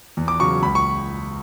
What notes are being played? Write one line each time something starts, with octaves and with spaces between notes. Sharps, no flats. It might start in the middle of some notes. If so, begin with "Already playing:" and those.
E2
D6
C#3 F#3 C#6
C#2 B5
C#6